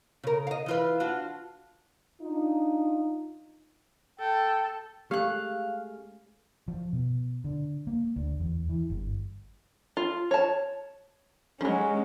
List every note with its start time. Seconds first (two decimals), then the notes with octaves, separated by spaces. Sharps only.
0.23 C#3 A#4
0.47 D#5 F5
0.66 E3 F4 B4
1.00 D4 F4 F#4
2.21 D4 D#4 F4
4.20 A4 G5
5.11 G#3 A3 C#4 G4 F5 F#6
6.68 F3
6.93 B2
7.44 D3
7.87 A#3
8.16 D2
8.40 E2
8.69 E3
8.90 G1
9.97 F4
10.31 C#5 A5
11.61 F3 F#3 G#3 C#4